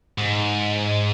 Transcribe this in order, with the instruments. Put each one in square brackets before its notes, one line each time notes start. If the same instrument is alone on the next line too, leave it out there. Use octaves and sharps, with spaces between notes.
[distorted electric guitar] G#2